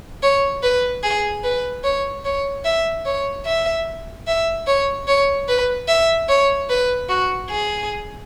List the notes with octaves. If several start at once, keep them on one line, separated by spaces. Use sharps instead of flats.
C#5
B4
G#4
B4
C#5
C#5
E5
C#5
E5
E5
C#5
C#5
B4
E5
C#5
B4
F#4
G#4